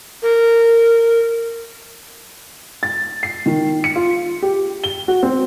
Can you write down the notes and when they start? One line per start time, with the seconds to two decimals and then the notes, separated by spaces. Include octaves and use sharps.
0.23 A#4
2.83 A6
3.23 C7
3.46 D#3
3.84 C#7
3.96 F4
4.42 G4
4.84 G7
5.08 F#4
5.23 C4